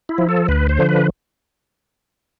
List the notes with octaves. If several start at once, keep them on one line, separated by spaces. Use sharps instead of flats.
E4
F3
A4
D2 B4
C5
D3 F3
B4